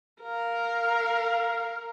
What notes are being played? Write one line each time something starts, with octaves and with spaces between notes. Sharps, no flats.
A#4 F5